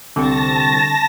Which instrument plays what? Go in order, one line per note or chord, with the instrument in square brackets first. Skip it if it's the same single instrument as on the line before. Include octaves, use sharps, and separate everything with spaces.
[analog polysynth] C2 C4 C#6 [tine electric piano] D3 [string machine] A5 A#6